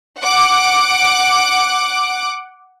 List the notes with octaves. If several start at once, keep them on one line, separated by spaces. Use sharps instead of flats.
F#5 D6